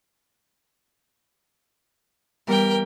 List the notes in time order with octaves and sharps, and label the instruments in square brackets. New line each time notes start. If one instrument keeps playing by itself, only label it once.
[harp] E3 G3 B3 [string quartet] A#4 G5